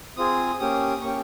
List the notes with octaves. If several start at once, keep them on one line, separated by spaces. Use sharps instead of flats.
C4 F4 G#4 D#6
A#3 C#4 G4 D#6
A#3 C#4 G4 C#6